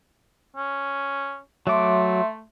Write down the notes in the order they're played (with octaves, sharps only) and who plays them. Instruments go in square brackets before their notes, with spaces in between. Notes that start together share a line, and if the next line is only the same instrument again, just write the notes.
[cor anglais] C#4
[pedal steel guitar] F#3 D6 [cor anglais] A3 [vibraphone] E5 C6